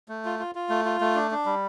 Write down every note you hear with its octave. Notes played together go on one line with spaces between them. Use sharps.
A3
F4
F4
F4
A3
F4
A3
D4
D4
G3